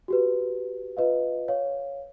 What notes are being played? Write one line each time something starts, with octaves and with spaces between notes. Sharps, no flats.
F#4 G4 B4
F4 B4 D#5 F5
C#5 F5